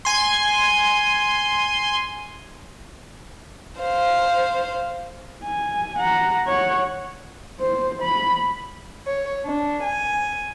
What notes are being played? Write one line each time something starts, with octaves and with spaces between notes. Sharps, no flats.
G#5 C6
C5 F5
G#5
F#5 A#5
C#5 F#5
C5
B5
C#5
D4
G#5